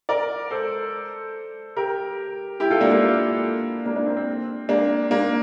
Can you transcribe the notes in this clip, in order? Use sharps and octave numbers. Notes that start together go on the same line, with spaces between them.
A#4 D5
A4 C5
G4 A#4
E4 G4
F4 A4
A#3 D4
A#3 D4
A#3 D4
A#3 D4
C4
C4
A#3 D4
A#3 D4